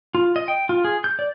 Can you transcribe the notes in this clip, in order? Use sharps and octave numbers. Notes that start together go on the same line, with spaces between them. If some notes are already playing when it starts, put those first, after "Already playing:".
F4
D#5
G5
F4
G#4
G6
D5